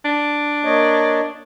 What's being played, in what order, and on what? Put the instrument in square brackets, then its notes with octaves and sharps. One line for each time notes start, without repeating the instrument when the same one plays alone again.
[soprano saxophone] D4
[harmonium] A#3 C#5 D#5